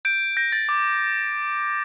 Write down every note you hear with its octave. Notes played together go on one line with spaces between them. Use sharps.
G6 D7
G6 A#6
A6
D6